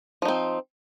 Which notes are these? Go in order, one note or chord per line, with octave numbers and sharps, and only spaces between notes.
F3 C4 D#4